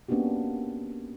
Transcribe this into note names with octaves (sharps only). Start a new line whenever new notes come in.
A#3 B3 C#4 D4 F#4 G4